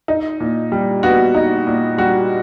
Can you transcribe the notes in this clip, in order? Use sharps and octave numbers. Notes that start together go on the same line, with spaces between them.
D#4
A#2
G3
B3 F#4
D#4
A#2
G3 F#4